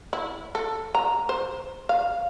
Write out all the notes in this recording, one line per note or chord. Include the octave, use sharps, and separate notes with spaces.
E4
A4
A#5
C5
F5